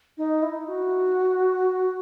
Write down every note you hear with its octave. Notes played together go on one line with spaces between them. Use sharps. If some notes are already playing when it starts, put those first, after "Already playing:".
D#4
E4
F#4